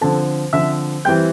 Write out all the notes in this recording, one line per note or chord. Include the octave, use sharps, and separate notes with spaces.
D3 F3 C4 A4 A5
D3 F3 C4 E5 E6
E3 G3 C4 G5 G6